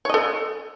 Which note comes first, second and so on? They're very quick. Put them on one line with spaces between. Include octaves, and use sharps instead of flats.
C#5 D#5 A4